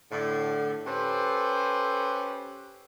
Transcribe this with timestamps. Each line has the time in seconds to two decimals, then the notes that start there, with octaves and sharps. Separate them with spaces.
0.12 A2 D3
0.86 C#4 G4 A4 B4 C5